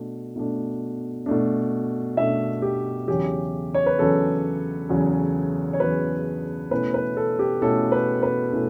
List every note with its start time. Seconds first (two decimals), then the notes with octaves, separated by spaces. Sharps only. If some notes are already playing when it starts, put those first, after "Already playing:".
Already playing: B2 A3 D4
0.36 B2 A3 D4
1.26 B2 A3 D4
2.17 B2 A3 D4 E5
2.62 G4
3.08 E2 C#3 F#3 C#4 G4
3.74 C#5
3.86 B4
3.98 E2 C#3 F#3 C#4 A4
4.89 E2 C#3 F#3 C#4
5.73 C#5
5.80 E2 C#3 F#3 C#4 B4
6.71 B2 A3 C#4 E4 B4
6.94 B4
7.17 A4
7.39 G4
7.62 B2 A3 C#4 E4 A4
7.92 B4
8.23 B4
8.53 B2 A3 C#4 E4